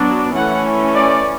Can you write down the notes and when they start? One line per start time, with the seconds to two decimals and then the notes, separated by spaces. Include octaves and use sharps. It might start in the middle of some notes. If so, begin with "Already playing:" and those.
Already playing: F#3 B3 D4
0.35 E3 A3 C#4 F#5
0.95 D5